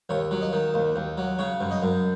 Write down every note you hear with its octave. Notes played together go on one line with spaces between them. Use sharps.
D#2 C#5
F#3
D#5
D#3
D#2
D#2
F#3
C#3 C#5
F#2
D#5
F#2